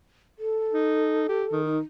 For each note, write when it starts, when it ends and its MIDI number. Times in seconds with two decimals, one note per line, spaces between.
0.39 1.61 69
0.73 1.24 63
1.28 1.45 67
1.52 1.78 51
1.65 1.79 63